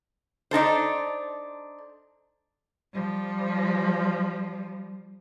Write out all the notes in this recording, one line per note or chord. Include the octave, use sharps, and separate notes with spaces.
D4 D#4 A4 C5
F3 G3